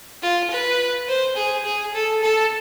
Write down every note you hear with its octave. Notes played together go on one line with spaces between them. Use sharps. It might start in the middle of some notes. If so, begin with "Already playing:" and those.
F4
B4
C5
G#4
G#4
A4
A4